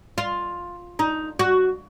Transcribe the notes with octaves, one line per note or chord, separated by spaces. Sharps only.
F4
D#4
F#4